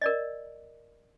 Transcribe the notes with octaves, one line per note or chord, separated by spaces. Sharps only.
A#4 D5 D#5